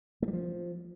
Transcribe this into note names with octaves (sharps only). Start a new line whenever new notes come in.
A3
G3
F3